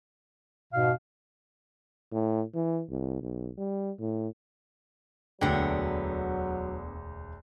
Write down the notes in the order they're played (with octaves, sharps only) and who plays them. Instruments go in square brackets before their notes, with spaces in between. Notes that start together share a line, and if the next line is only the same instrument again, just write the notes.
[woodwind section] F2 G#2 B2 [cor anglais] F5
[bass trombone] A2
E3
C2
B1
G3
A2
[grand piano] E1 D2 G5 [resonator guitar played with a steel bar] D3 B3 [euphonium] F#3